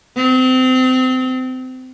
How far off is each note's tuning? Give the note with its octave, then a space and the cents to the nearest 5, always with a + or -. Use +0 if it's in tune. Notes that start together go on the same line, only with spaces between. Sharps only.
C4 -30